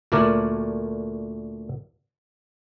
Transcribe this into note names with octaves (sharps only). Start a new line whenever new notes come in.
D2 A#2 A3 D4 A#4 D5